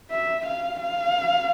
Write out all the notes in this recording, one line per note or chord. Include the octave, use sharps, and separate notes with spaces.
E5
F5
F5